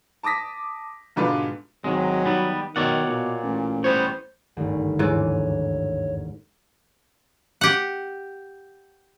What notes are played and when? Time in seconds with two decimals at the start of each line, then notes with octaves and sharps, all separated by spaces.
0.23 A5 D6 D#6 A#6 B6
1.16 G#2 B2 D3 G#3 F4 B4
1.84 G#1 D#3 F#3 G#3
2.26 D#3 G3 B3
2.76 B2 D#3 C#5 D5 F#5
3.07 A#2
3.43 A1
3.84 G3 B3 C5 C#5
4.57 G#1 D2 G2
4.99 D#2 G#2 E3 C#5 D5
7.61 G4 F#5